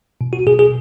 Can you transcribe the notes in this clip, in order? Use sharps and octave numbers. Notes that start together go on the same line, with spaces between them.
B2
F#4
B2 G#4
G#4